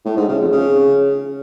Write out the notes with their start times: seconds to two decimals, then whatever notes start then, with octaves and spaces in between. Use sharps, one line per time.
0.05 A2
0.17 G#2
0.29 C#3
0.40 F2
0.52 C#3